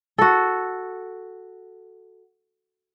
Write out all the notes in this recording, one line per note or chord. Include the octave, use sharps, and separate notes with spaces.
F#4 A4